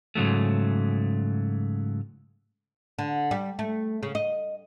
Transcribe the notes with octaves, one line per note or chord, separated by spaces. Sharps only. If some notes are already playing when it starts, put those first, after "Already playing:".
G#2 C#3 F#3 A3
D3
G3
A3
C#3
D#5